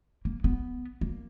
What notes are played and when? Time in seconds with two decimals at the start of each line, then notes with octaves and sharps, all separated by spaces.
0.25 A#3
0.44 B3
1.01 A#3